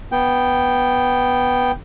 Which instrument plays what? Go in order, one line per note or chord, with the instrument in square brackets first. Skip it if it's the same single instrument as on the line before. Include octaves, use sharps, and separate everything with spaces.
[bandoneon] B3 G5